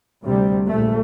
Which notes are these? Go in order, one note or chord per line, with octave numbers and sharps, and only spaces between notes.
D2 C3 G3
A#1 A3